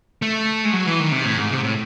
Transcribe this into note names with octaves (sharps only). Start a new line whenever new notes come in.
A3
G#3
F#3
E3
D#3
C3
A2
G#2
C3
A2